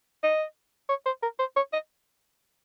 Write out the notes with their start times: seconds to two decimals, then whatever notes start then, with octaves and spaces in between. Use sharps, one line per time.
0.23 D#5
0.89 C#5
1.06 C5
1.23 A#4
1.39 C5
1.56 C#5
1.73 D#5